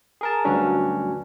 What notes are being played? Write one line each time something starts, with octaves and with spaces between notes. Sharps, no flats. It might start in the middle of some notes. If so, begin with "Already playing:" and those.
G#4 A#4 A5
D2 G2 F#3 C#4 D4